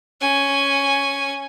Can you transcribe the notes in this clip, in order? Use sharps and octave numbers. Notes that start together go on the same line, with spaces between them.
C#4 G#5